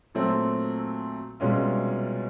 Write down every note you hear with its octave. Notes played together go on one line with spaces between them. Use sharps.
A#2 F#3 A3 C4
C2 B2 G#3 C#4 F4